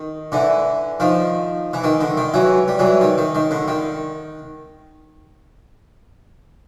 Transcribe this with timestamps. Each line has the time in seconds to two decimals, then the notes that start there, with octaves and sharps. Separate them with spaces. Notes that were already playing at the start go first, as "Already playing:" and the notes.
Already playing: D#3
0.32 D3 E3
1.00 D#3 F3
1.73 E3
1.84 D#3
2.01 D3
2.17 D#3
2.34 E3 F#3
2.68 G3
2.79 E3 F#3
3.01 D#3
3.18 D#3
3.35 D#3
3.51 D3
3.68 D#3